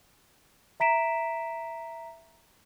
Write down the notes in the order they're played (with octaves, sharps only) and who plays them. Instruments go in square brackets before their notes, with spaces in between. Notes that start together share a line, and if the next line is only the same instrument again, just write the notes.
[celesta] E5 A#5 B6 D7 E7